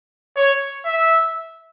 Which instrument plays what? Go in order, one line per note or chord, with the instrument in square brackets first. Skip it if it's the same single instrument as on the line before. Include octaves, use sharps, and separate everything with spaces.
[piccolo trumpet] C#5
E5